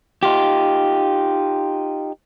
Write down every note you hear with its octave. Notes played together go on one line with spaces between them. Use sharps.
D#4 F4 G4